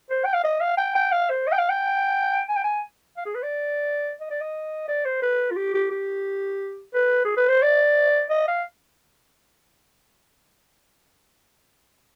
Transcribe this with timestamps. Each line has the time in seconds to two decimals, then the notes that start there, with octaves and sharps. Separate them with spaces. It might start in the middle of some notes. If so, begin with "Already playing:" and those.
0.10 C5
0.25 G5
0.34 F5
0.44 D#5
0.61 F5
0.77 G5
0.95 G5
1.12 F5
1.30 C5
1.47 D#5
1.53 G5
1.58 F5
1.69 G5
2.49 G#5
2.56 G5
2.64 G#5
3.17 F5
3.26 G#4
3.35 B4
3.43 D5
4.21 D#5
4.30 D5
4.41 D#5
4.88 D5
5.05 C5
5.22 B4
5.51 F4
5.56 G4
5.74 G4
5.91 G4
6.94 B4
7.25 G#4
7.37 B4
7.49 C5
7.62 D5
8.30 D#5
8.48 F5